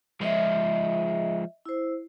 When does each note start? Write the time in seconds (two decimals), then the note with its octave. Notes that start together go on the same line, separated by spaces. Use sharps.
0.21 F3 G#3 D#5 E5
1.65 E4 C5